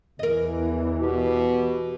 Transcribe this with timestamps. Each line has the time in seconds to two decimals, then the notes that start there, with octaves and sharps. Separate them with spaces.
0.19 E2 E3 A#4 D#5
1.00 B2 G4